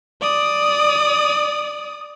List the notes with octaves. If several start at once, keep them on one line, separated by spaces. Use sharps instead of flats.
D5 D#6